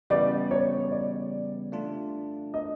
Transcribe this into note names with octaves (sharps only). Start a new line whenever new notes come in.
C#3 E3 G3 B3 D5
C#5
D5
A3 D4 F4
D#5